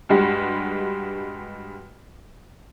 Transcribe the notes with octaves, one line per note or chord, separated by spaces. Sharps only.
G2 G3 G#3 F#4